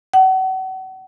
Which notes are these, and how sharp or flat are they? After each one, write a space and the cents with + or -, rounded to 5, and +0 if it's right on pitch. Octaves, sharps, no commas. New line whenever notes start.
F#5 +35